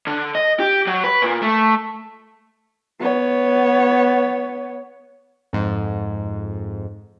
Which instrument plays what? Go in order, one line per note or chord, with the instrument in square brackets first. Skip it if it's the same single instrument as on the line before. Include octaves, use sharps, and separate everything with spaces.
[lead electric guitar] D3
D#5
G4
F#3
B4
A#2
A3
[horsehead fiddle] B3 C#5
[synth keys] F2 G#2